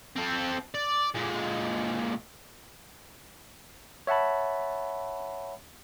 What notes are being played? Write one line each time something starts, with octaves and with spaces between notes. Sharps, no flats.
C4 A4
D5
A#2 G#3
C#5 E5 F#5 A5 B5